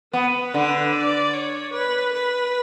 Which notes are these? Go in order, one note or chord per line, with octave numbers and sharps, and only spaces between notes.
B3 B4
D3
D5
C#5
B4
B4